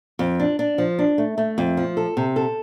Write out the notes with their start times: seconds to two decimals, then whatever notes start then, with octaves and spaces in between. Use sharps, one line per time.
0.19 F2
0.40 D4
0.59 D4
0.78 F3
0.99 D4
1.18 A3
1.38 A3
1.58 F2
1.77 F3
1.97 A4
2.17 C3
2.36 A4